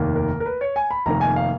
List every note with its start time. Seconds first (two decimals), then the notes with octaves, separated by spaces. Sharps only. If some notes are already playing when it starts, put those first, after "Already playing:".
Already playing: F1 D#2 D#3 A#3
0.15 A#4
0.40 A#4
0.46 B4
0.61 C#5
0.76 G#5
0.91 B5
1.06 F1 F2 D#3 A#3 A#5
1.21 G#5
1.36 F5